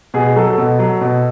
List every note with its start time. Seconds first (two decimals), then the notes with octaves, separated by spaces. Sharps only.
0.14 B2 G#4
0.36 F#3 A4
0.50 A4
0.58 B2
0.79 F#3
1.01 B2